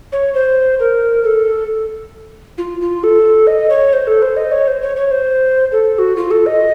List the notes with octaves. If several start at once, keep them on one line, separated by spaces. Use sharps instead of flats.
C#5
C5
A#4
A4
F4
F4
A4
D#5
C#5
C5
A4
C5
D#5
C#5
C5
C#5
C#5
C5
A4
A4
F#4
F4
A4
D#5